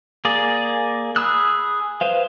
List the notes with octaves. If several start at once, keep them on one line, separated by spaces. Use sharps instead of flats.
A#3 G#4 D5
G#4 B5 D#6 E6 F#6
B4 C5 F5